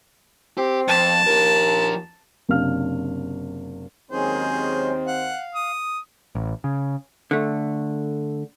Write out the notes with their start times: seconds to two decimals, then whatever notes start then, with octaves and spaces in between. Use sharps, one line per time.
0.58 C4 G4
0.88 F2 A5
1.27 D#2 F3 A#4
2.49 F#1 C3 D4 F5 F6
4.11 D#2 D#3 F#3 G#3 C4 C#4 G#4 C5
5.07 F5 F#5
5.55 D#6
6.35 A1
6.64 C#3
7.31 D3 A3